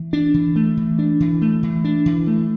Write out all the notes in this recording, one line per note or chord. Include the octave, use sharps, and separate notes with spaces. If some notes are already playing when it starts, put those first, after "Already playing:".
Already playing: E3
D4
E3
A3
E3
D4
E3
A3
E3
D4
E3
A3